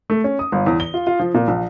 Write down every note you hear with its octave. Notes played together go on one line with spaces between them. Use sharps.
A3
C#4
D#6
G1
E2
G7
F4
F4
F3
A#2
A#1